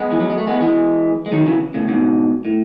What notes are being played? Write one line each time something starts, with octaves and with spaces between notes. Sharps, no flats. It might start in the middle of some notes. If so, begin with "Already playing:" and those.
Already playing: G#3 B3
E3
F#3
G#3
A3
G#3 B3
E3 G#3
G#3
D#3 F#3
C#3 E3
A2 C#3
G#2 B2
A2